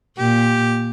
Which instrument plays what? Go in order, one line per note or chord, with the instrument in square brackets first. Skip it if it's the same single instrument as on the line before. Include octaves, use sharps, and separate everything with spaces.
[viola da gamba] A#2 [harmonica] G4